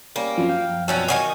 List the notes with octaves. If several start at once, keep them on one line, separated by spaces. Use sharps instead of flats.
G3 A#3 C#4
F#2 F3 C4
F5 G5
B2 C#4 F#4 E5 G5 A5
D#3 F3 F#4 G#5 C#6 D#6